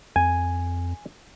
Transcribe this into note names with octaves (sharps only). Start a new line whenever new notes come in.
F2 G#5